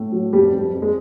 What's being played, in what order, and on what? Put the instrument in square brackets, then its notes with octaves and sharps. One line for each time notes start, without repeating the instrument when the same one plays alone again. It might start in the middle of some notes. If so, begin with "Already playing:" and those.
Already playing: [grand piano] A2
F#3
F2 G3
F2
F2
G#3